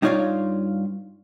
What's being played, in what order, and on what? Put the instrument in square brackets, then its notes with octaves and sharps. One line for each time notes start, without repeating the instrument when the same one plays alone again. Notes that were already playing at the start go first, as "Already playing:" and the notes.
[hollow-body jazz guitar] G2 D#4 F4 C#5 D5 F5